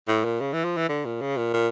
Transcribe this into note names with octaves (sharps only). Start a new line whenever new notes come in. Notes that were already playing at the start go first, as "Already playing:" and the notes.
A2
A#2
C#3
E3
F3
E3
D3
A#2
C#3
A#2
A#2